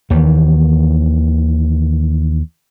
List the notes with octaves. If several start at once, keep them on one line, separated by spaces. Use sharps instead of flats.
D#2 D#3 E3